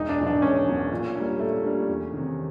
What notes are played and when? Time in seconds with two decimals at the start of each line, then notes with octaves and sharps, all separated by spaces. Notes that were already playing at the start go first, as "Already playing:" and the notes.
Already playing: E1 D#4
0.09 D4
0.18 E2 B2 F#3
0.26 D4
0.42 E1 C#4
0.66 E2 B2 F#3
0.92 A#2
1.15 G3 A#3 D4
1.39 A#2 A3
1.64 G3 A#3 D4
1.88 E2
2.13 C3 D#3